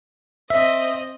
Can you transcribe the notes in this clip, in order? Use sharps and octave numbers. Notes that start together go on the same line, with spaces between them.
C4 D#5 E5